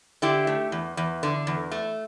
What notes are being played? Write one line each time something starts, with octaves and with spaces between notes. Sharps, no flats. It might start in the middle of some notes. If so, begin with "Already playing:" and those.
D3 E4 G4
A3
E2
E2
D3
E2
A3